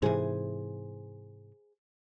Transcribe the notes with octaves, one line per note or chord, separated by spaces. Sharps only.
G#2 C3 E3 G#4 C5 G#5